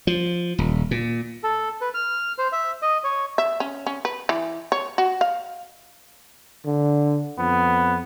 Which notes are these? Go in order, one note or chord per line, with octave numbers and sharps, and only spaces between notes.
F3
D#1
A#2
A4
B4
F6
C5
E5
D#5
C#5
E5
C#4
C#4
B4
E3
C#5
F#4
F5
D3
F2 B3